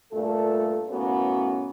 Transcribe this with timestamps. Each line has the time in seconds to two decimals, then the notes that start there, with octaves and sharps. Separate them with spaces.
0.11 G2 A#2 A3 A4
0.90 F#2 A2 A#3 B3 C#4 F#4